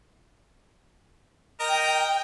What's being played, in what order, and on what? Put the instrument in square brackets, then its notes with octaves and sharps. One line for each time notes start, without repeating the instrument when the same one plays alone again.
[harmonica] A#4 D#5 A#5 [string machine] G5